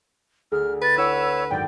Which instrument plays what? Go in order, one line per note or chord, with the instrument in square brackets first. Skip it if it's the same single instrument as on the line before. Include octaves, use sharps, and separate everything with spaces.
[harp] D2 [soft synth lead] G#4 [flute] F6
[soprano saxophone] B4 [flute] A6
[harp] E4 F#5 G5 [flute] C#5 [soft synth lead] E6
[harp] G#1 F#2 [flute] D5 [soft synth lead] G5